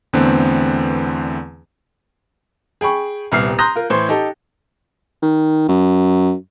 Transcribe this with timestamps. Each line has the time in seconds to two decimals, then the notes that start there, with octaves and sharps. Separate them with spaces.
0.13 E2 D3 A3 B3 C4
2.81 G#4 G5 B5 C#6
3.32 D#1 C2 B3 F6 C7
3.59 A#5 C6 D#6 F#6 G6 A#6
3.76 F4 A#4
3.90 A2 E3 C5 C6
4.09 D#4 G4 A4
5.22 D#3
5.68 F#2